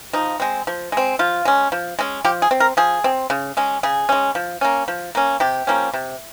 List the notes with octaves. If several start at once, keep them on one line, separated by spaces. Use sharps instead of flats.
F3 D#4
G#3 C4
F3
G#3 C4
F3 F4
G#3 C#4
F3
G#3 C#4
F3 G4
G#4
C4
A#4
F3 G#4
C4
C#3
G#3 C#4
C#3 G#4
G#3 C#4
F3
A#3 C#4
F3
A#3 C#4
C3 G4
F3 A#3 C#4
C3